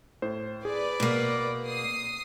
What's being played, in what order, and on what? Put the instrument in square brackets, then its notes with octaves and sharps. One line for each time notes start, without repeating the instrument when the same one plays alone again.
[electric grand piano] A2 C5
[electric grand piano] G#4 [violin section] B4 D5
[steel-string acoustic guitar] B2 A#3
[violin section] D#6 C7